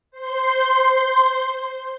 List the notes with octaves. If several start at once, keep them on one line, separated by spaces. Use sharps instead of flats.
C5 C6